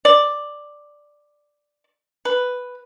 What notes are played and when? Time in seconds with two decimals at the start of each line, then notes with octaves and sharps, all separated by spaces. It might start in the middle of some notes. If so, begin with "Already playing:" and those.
0.05 D5
2.25 B4